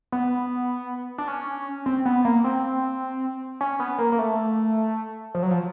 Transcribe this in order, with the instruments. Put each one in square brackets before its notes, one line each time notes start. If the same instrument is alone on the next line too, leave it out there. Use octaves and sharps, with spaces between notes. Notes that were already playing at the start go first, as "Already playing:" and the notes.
[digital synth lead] B3
D4
C#4
C4
B3
A#3
C4
C#4
B3
A#3
A#3
A3
F3
F#3
F3